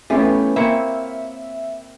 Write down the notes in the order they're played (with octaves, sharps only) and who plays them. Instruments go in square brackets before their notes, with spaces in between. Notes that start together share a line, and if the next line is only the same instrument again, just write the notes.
[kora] E3 F4 G4 [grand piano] A3 B3 C#4
[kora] A#3 C4 C#5 [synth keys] E5 [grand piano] B5 C#7